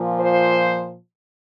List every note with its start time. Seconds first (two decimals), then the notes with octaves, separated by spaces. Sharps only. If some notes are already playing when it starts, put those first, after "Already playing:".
Already playing: A#2 F3
0.19 C5